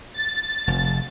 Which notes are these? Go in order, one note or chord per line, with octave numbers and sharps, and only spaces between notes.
A6
F1